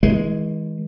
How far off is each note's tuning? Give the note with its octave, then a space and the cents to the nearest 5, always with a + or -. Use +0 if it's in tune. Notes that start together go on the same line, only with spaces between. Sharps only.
E3 -45 G#3 +0